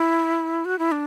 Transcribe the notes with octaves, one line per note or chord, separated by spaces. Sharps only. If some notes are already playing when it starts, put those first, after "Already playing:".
Already playing: E4
F#4
E4
D4